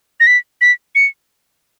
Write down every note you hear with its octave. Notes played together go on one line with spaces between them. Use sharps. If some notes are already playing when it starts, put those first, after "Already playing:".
A#6
B6
B6
C#7